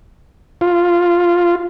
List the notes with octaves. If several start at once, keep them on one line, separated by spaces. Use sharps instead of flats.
F4